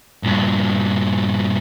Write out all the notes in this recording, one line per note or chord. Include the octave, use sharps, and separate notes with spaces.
G2 A#2